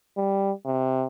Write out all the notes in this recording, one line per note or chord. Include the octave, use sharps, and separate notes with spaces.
G3
C3